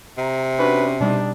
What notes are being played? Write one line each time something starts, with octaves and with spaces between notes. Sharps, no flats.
C3 A#5
C#4 D4 F#4 B4
B2 G3 D4 D#4